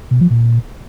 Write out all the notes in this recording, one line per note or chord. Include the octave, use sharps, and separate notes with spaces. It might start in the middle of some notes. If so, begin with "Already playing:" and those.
B2
F3
A#2